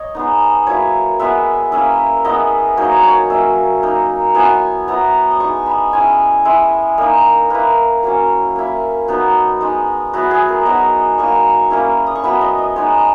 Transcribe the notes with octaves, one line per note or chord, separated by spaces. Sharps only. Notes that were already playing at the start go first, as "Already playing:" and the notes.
Already playing: C#5 D#5
G#3 B3 D#4
F#3 A#3 E4 C#5
G#3 B3 E4 E5
A#3 C#4 E4 E5
G#3 B3 E4 D#5
F#3 A#3 D#4 C#5
D#5
C#5
C#5
F#3 A#3 C#4 E5
A#3 D#4
F#3 B3 E4 G#5
F#3 B3 E4 A#5
D#6
G#3 D#4 C#6
B5
G#3 C#4 E4 G#5
G#3 C#4 E4 E5
A#3 D#4 D#5
A#3 E4 B4
F#3 A#3 C#4
A#3 E4
F#3 B3 D#4
G#3 D#4
F#3 B3 E4 F#4
G#4
A#4
F#3 B3 D#4 D#5
F#3 A#3 D#4 C#6
A#3 C#4 E4
D#6
C#6
F#3 B3 E4 B5
D#5
D#5
G#3 B3 D#4 C#5